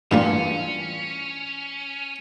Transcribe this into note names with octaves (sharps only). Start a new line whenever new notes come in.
G2 A#2 E3 G3 C#4 D4 F4